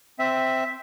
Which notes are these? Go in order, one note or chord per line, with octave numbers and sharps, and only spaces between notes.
C4 E5